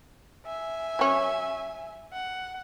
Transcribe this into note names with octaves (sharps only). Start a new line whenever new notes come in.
E5 G#5
F#3 C#4
F#5